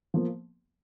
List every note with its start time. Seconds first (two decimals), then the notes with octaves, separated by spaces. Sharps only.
0.14 F3 A#3